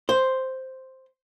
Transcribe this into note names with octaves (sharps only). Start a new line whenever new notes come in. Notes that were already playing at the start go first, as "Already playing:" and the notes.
C5